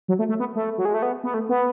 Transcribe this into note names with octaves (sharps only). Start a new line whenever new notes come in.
F#3
A3
A3
B3
A3
F#3
G#3
A3
B3
B3
A3
B3